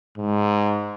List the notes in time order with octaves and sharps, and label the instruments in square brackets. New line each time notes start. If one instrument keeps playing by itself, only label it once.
[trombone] G#2